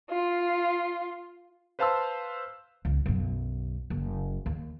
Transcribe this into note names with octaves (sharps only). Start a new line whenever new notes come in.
F4
B4 C5 F5 A5 C6 E6
C#2
B1 F#2
F#1
D#2